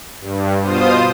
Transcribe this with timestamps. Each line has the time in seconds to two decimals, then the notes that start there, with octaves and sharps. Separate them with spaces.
0.21 G2
0.62 B2 F4 C5 D#6